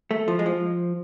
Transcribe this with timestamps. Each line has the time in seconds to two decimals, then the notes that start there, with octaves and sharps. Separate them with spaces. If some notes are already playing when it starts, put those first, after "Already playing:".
0.11 A3
0.28 F3
0.39 G#3
0.46 F3